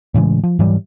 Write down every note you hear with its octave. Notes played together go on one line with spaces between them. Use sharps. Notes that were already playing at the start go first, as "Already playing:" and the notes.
A2 C#3 E3 G#3
F3
G#2 E3 F#3 G3